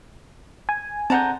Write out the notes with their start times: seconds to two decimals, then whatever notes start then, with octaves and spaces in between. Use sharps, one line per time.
0.69 G#5
1.10 D3 C4 G#4 F#5 A5 A#5 G6